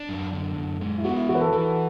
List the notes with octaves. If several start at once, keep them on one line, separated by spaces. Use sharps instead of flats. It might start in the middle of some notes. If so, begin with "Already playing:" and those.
Already playing: D4
F#2
D3
F#2
G#3
E4
B3 F#4
E4
E3 F#4
B4
A4
E3 A4